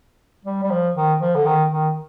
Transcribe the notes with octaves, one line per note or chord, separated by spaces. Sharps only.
G3
G3
F3
D#3
F3
D3
D#3
D#3